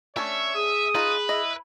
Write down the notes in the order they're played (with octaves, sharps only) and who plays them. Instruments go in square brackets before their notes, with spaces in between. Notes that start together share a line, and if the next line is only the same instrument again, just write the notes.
[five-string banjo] A3 C#4 D4 [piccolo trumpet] C#5 [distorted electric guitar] E5
[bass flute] G#4 [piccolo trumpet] D#6
[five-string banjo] D#4 F4 [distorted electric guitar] B4
[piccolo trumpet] E4 [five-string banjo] D#5